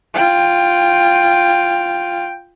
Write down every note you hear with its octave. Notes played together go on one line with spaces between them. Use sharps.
F4 G5